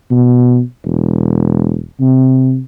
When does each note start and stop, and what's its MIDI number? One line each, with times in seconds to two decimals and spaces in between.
0.11 0.61 47
0.85 1.81 28
2.00 2.60 48